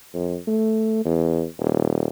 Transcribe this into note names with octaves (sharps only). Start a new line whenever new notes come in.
F2
A3
E2
D#1